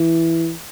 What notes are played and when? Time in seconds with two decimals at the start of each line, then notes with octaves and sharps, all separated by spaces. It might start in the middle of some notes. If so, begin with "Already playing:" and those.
Already playing: E3